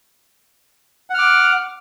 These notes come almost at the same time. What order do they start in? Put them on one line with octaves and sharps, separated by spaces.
F#5 F6 D6